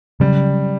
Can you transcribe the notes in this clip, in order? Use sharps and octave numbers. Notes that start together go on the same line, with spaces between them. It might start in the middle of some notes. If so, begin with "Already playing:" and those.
C#3 F#3 G3 C#4